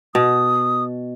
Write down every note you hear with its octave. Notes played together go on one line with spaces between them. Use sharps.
B2 D#6